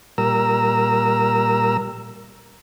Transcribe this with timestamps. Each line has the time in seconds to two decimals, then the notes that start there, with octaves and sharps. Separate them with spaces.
0.18 A#2 G3 A#4 A#5 E6